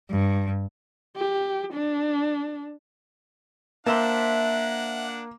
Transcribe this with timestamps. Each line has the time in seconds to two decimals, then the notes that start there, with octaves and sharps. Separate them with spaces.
0.10 G2
1.17 G4
1.74 D4
3.86 A#3 D4 C5 E5 F#5 A5